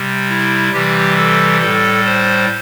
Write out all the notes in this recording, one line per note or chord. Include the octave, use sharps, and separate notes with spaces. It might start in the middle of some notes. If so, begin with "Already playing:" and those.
Already playing: C3 G3
E4
C3 E3 G3 G4
A4
A2 G3 A4
C5